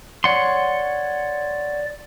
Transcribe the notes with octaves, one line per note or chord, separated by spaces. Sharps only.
C#5 D5 F#5 C6